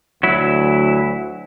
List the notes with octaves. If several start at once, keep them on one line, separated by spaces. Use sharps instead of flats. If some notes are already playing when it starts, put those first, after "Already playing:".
D2 F#3 E4